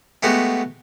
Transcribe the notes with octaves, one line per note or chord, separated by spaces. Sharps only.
G#3 A3 B3 F#4 G4